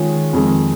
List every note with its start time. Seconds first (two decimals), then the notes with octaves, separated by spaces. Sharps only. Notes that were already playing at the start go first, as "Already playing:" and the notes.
Already playing: D#3 G#3 C#4 F4 G#4
0.33 F2 D#3 G#3